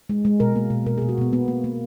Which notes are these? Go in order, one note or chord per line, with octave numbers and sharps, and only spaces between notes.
G#3
G#3
B2 A#4
A#3
B2
B2 A#4
G#4
B2
F#4
B2 B3
A#3 B3
A#3
A#3